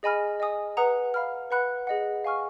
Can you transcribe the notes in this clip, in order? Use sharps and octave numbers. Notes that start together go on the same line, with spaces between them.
G#4 D#5 G#5 B5 F6
D#5 G#5 D#6
B4 F#5 A#5 D#6
F5 B5 F6
B4 F#5 B5 F#6
G#4 D#5 F#5
F5 G#5 C#6 F6